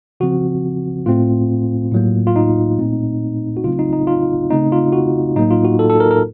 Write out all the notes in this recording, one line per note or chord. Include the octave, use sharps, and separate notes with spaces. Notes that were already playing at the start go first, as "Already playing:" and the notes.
C#3 F3 C4 F#4
A2 A3 C4 F4
A2 F#3 A#3
F4
D#4
A#2 A3 C4
F#4
C#3 F#3 A3 C4 F4
D#4
D#4
F4
C#3 A3 C4 D#4
F4
F#4
A2 F#3 A#3 D#4
F4
F#4
A4
A4
A#4
A#4